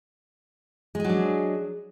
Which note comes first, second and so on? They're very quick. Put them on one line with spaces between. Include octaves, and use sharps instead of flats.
G#3 G#4 F#3 D4